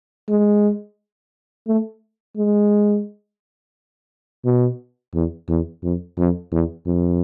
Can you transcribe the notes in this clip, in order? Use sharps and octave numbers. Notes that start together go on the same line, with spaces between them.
G#3
A3
G#3
B2
E2
E2
F2
F2
E2
F2